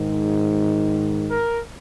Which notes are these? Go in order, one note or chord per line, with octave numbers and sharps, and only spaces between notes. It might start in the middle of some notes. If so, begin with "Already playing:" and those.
Already playing: G#2 D#3
A#4